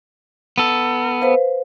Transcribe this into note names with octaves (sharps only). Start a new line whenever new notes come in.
B3 A4
B4 C5 F5